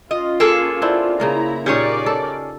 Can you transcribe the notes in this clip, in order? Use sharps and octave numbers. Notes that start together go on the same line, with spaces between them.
C#4 F4 D#5
A#3 G#4 A4
C4 D4 E4
C#3 A#3 E4 F4 A#5
A#2 C#4 D#4 G4 G#4 A#4 C#5 D5
A4